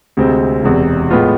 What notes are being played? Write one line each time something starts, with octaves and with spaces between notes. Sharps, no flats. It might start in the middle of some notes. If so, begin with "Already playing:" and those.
D2 C3 G#3 C4
E1 E2 C3
A2 G#3 B3 F4